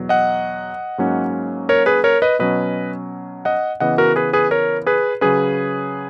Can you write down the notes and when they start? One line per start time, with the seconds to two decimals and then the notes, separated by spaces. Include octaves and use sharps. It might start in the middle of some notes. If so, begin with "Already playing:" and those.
Already playing: E2 B2 F#3
0.09 D#5 F#5
0.98 G#2 F#3 A#3 C#4
1.69 A#4 C#5
1.86 G#4 B4
2.04 A#4 C#5
2.22 B4 D#5
2.39 B2 F#3 C#4 B4 D#5
3.45 D#5 F#5
3.80 C#3 E3 B3 D#5 F#5
3.98 F#4 A#4
4.16 G#4 B4
4.33 G#4 B4
4.51 A#4 C#5
4.86 G#4 B4
5.21 C#3 F#3 C#4 G#4 B4